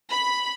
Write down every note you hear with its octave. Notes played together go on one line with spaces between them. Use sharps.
B5